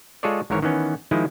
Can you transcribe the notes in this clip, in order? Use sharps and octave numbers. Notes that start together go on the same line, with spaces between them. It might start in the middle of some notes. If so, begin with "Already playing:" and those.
G#3 F4 G#4 A4 C#5 D5
G#1 G#2 E3 A#4 C#5
D#3 E3 B3 C#4
D#3 F3 G#3 E4